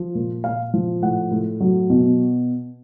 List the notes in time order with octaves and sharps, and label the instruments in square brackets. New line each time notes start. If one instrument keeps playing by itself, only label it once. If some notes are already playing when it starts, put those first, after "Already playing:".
Already playing: [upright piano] F3
A#2
A#2 F5
F3
A2 F#5
A2
F#3
B2